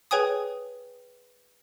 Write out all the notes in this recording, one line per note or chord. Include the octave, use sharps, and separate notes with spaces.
G#4 B4 C#5 G5 G#5 D#6